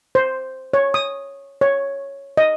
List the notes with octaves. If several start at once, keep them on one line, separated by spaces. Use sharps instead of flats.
C5
C#5
D#6
C#5
D#5